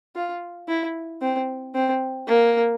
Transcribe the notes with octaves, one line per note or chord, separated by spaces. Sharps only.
F4
E4
C4
C4
A#3